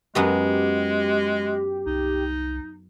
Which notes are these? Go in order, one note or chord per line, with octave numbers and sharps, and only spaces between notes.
F#2 G#3 B3 F#4 G4
C2 D#4